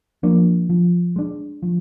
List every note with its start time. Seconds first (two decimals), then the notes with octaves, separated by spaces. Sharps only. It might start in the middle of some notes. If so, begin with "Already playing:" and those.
0.23 F3 A#3 D4
0.70 F3
1.16 G#3 D4
1.62 F3